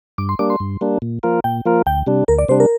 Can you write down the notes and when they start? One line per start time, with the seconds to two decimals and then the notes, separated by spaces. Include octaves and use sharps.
0.18 G2 D6
0.29 C6
0.39 G3 A#3 D4 D6
0.50 C6
0.60 G2
0.81 G3 A#3 D4
1.02 A#2
1.23 F3 A#3 F4 A#4
1.44 A#2 G5
1.65 F3 A#3 F4 A#4
1.86 D2 G5
2.07 C3 G3 D4
2.28 D2 A#4
2.38 D5
2.48 C3 G3 D4 C5
2.60 A#4